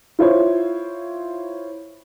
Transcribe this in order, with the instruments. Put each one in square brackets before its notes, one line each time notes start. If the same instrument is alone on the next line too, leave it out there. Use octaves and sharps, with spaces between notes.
[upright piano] E4 F4 C5 C#5